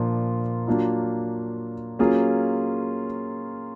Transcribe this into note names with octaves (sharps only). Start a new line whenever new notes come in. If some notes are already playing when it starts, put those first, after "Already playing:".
Already playing: A#2 F3 A#3 D4 F4
F#3 A#3 D4 F4
F#3 A#3 C#4 F4 G#4